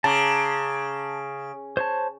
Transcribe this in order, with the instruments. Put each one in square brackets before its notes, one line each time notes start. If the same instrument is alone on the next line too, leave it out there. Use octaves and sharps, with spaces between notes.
[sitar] C#3 [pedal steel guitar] A5 A#5 D6
[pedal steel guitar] C5 C#5 A5